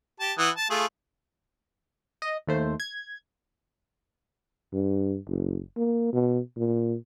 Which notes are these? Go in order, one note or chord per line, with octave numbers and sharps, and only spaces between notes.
G4 A5
E3 F#5 D#6
A5
A3 F4 G#4
D#5
D#2 A3 C5
G#6
G2
F#1
A#3
B2
A#2